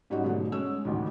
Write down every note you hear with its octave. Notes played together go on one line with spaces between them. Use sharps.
G#2 G3 C#4 D#4 F#4
G#2 B2 D3 F#3 G#3 A3
G#3 C#4 E6
A1 D2 D#3